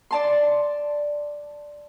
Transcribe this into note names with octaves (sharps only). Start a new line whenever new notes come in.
D5 A5 C6